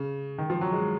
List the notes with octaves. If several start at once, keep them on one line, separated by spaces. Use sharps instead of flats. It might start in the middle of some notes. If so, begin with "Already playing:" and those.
Already playing: C#3
D#3
F3
F#3
G#3